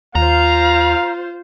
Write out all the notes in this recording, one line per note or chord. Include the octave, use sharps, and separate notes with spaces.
D#2 F4 C5 F5 A#5